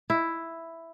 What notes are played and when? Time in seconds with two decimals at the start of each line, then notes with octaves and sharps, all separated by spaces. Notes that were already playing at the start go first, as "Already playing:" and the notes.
0.10 E4